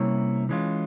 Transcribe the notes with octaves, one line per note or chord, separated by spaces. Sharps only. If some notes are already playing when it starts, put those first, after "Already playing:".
Already playing: C3 G3 A#3 C#4 E4 C#5
E3 G#3 C#4 F4